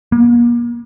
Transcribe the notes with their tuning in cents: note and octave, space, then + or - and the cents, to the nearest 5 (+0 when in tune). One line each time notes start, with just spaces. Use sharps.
A#3 +40